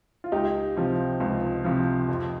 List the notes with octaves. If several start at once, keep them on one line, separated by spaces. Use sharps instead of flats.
F4
C#2 D#4 G4
C3 F3
C#2
C3 F3
F2